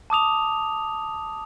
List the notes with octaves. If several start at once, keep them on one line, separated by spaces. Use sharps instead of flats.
A5 D6 D#6 F7